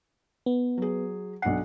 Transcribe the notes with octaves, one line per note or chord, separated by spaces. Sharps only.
B3
F#3 G#4
B1 D4 F#5 C7